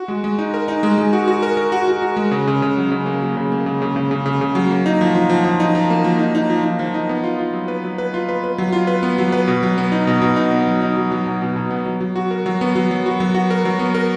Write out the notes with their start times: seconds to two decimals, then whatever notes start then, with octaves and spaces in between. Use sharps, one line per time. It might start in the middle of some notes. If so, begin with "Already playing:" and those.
Already playing: F#4
0.08 G#3
0.24 G#3
0.38 D#4
0.54 A#4
0.68 D#4
0.83 G#3
0.98 G#3
1.13 F#4
1.28 F#4
1.43 A#4
1.57 A#4
1.72 F#4
1.88 F#4
2.02 F#4
2.17 G#3
2.31 C#3
2.47 C#3
2.62 C#3
2.77 F#3
2.91 C#3
3.06 A#3
3.22 F#3
3.37 C#3
3.52 A#3
3.66 C#3
3.82 C#3
3.96 C#3
4.11 C#3
4.26 C#3
4.41 C#3
4.55 F#3
4.70 A#3
4.86 D#4
5.01 F3
5.15 F3
5.30 F3
5.44 F3
5.60 D#4
5.75 F3
5.90 A#3
6.04 F3
6.19 D#4
6.35 D#4
6.50 F3
6.64 D#4
6.79 F3
6.94 D#4
7.09 B3
7.24 F4
7.39 F4
7.53 F#3
7.68 B4
7.84 F#3
7.98 B4
8.14 F4
8.29 B4
8.44 B4
8.58 F#3
8.73 F4
8.87 B4
9.03 B3
9.18 F#3
9.32 B4
9.48 B2
9.63 F#3
9.78 B3
9.92 D#4
10.07 B2
10.21 B2
10.36 D#4
10.51 B3
10.67 F#3
10.82 D#4
10.97 F#3
11.12 F#3
11.27 B2
11.42 B2
11.56 B2
11.71 B3
11.86 F#3
12.00 F#3
12.16 F#4
12.31 A#4
12.46 F#3
12.61 B3
12.75 F#3
12.91 F#3
13.06 F#4
13.20 F#3
13.35 F#4
13.50 A#4
13.65 F#3
13.79 B3
13.95 A#4